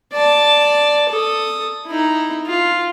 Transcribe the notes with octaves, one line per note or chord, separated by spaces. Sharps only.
D5 A5
A4 D#6
D#4 E4
F4